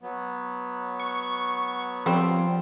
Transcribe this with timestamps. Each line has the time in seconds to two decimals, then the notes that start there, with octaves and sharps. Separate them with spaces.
0.02 F#3 B3
1.00 C#6
2.06 F3 G3 C4